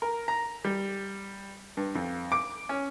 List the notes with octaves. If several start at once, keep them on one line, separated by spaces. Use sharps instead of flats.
A#4
A#5
G3
G2
F2
D6
C#4